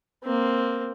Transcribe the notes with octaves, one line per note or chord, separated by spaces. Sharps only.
A#3 C4